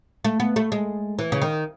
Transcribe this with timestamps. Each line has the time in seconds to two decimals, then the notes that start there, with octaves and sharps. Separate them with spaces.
0.25 A3
0.40 B3
0.56 A3
0.72 G#3
1.19 E3
1.32 C#3
1.42 D#3